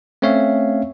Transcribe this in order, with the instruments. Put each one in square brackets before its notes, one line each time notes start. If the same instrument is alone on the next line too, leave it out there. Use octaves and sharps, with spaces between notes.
[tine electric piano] A3 C4 C#4 C#5 E5 F5